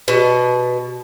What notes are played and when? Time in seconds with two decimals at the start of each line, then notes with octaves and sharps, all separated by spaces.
0.08 B2